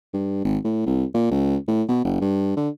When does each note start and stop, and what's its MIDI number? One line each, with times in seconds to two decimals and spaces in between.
0.13 0.41 43
0.45 0.58 32
0.64 0.82 45
0.86 1.04 36
1.14 1.30 46
1.31 1.56 37
1.68 1.83 45
1.88 2.00 47
2.04 2.18 30
2.21 2.56 43
2.57 2.69 50